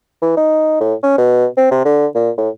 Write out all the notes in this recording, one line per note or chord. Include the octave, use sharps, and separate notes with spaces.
E3
D#4
A2
C#4
B2
C4
C3
D3
A#2
A2